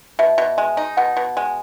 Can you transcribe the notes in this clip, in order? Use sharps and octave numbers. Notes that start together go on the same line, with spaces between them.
B2 E5
B2
G#3
D#4
B2 F#5
B2
G#3